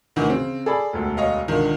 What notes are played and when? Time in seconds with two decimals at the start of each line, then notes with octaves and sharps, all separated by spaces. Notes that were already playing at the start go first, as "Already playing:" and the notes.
0.16 D2 D#3 E3
0.30 C#3 C4
0.66 G#4 A4 D5 B5
0.93 E1 D2
1.17 C#5 D#5 F5
1.48 C#2 A#2 D3 D#3